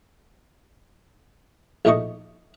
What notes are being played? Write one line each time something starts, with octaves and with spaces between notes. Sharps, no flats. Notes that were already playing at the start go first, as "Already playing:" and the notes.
A#1 A2 A3 D#4 D#5 C#6